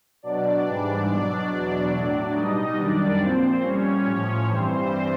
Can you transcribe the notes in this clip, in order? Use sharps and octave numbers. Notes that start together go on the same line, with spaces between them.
B2 F#3 D4 D5
G#2 E3 G3 D4 D5
B2 F#3 D4 D5
E2 B2 F#3
A2 F#3
B2 G3 D#4 D#5
F#2 D#3 G3 D4 D5
A#2 F3 C4 C5
A#2 G3 C#4 C#5
A2 F3 C#4 C#5
G2 E3 G3 C4 C5